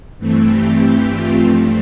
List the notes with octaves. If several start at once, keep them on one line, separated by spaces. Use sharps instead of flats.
G2 E3 A3 C4
G4
F4
G2 F3 A3 C4